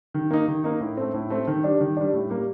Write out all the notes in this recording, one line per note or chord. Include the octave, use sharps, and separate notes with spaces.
D#3
A#3 D#4
D#3
A#3 D#4
A2
A3 C4
A2
A3 C4
D#3
G3 D4
D#3
G3 D4
A2
G3 A#3